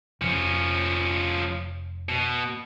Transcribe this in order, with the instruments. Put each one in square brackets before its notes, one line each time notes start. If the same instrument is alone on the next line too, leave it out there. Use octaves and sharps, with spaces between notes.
[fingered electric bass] F1 [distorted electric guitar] F3 C#4
[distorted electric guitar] B2